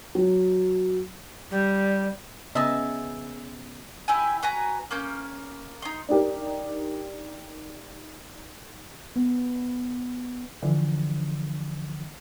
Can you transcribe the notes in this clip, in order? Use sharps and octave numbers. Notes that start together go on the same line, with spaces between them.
F#3
G3
C#3 B3 D#5 E5 G#5 A5
E4 G4 G#5
F#4 B4 G#5 A#5
A#3 C#4 G6
D#4 C6
D4 D#4 G4 A#4
B3
D3 E3 F3 D4